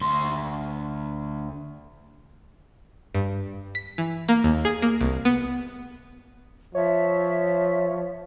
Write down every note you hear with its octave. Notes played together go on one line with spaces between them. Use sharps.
D2 C6
G2
B6
E3
A#3
D#2
G#4
A#3
C2
B3
F3 C#5 E5